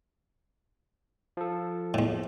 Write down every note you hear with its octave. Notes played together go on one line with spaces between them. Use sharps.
F3 A4
E2 A2